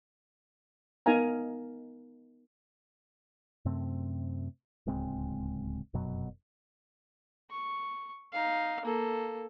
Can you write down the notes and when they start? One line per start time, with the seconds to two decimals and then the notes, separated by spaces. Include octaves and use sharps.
1.06 B3 D#4 A#4 F5 G#5 A#5
3.65 F#2 C3 A3 C4
4.86 D1 C#2 G#3 C4
5.94 F1 F#2 B2 F#3
7.51 C#6
8.33 D#4 F5
8.84 A#3 A4